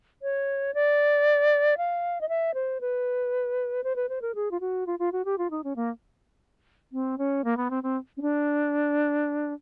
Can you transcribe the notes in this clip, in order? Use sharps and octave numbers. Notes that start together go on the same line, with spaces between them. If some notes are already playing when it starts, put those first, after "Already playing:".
C#5
D5
F5
D#5
E5
C5
B4
C5
B4
C5
A#4
G#4
F4
F#4
F4
F4
F#4
G4
F4
D#4
C#4
A#3
C4
C#4
A#3
B3
C4
C4
C#4
D4